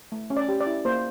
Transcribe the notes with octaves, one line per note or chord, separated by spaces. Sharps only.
A3
C#4
D5
G4
D5
E4
A#3 C5